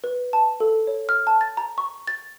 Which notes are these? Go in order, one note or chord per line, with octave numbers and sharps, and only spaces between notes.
B4
A5
A4
C#5
F6
A5
A6
A#5
C#6
A6